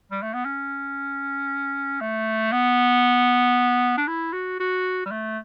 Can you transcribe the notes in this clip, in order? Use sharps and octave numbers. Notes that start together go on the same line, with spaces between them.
G3
A3
B3
C#4
A3
B3
D4
E4
F#4
F#4
G3
A3